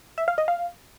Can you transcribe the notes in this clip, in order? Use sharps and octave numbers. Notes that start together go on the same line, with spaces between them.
E5
F5
D#5
F5